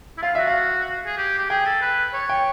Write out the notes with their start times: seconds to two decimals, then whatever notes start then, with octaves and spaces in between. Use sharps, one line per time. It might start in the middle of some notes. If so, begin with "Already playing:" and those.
0.18 E4
0.22 F4 F5
0.35 F#4 E5
0.47 F5
1.06 G#4
1.17 G4
1.38 G4
1.50 G#4 G5
1.66 A4
1.81 B4
2.13 C#5
2.29 G5